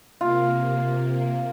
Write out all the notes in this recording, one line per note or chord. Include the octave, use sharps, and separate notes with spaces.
C3 A#3 F4